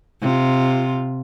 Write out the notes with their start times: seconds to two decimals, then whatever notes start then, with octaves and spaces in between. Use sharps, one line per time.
0.21 C3 F4